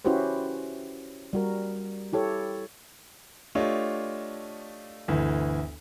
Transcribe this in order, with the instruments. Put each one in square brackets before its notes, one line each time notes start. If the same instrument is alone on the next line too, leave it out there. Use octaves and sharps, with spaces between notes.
[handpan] C#4 E4 F#4 G4 B4 C5
G3 F#4 A#4
E4 G4 A4 C#5
[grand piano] A3 D4 F4 G4 C#5 D#5
G1 D2 E3